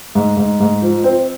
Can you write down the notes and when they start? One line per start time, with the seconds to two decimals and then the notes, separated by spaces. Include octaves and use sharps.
0.15 G#2
0.37 G#2
0.60 G#2
0.82 F3
1.04 C4